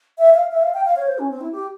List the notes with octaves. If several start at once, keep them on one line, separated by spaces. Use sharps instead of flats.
E5
F5
E5
F5
G5
F5
C#5
C5
C#4
C4
E4
G4